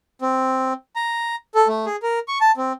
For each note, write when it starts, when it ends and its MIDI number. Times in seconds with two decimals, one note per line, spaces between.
0.22 0.73 60
0.96 1.36 82
1.55 1.68 69
1.68 1.86 57
1.86 1.96 68
2.03 2.19 70
2.28 2.38 85
2.41 2.52 81
2.57 2.73 60